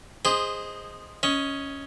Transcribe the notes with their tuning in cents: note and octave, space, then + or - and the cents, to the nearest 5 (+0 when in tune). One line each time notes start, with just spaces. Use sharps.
G#4 -20 C5 +0 D#5 +0
C#4 +0 D#5 +15